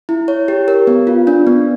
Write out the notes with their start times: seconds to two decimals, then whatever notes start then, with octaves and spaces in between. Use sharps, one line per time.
0.09 E4
0.28 C#5
0.48 G4
0.68 A#4
0.87 B3
1.07 F4
1.27 D4
1.47 B3